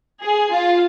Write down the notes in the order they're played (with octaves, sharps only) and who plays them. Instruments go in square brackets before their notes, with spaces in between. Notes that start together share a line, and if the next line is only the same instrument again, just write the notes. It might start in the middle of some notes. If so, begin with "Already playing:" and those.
[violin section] G#4
F4